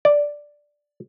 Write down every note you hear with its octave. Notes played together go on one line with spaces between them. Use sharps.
D5